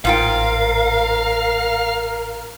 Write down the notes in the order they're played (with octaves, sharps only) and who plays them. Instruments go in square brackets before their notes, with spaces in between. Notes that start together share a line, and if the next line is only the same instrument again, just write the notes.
[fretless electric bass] A1 [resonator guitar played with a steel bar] G#2 F4 G5 [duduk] A#4 [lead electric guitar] F5